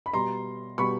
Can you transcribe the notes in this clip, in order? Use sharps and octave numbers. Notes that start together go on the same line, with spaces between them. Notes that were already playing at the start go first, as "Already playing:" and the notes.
B5
B2 G3 A#5 C6
B2 G3 B5 C#6